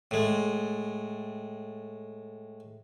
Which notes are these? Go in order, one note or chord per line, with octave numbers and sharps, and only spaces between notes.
A2 G#3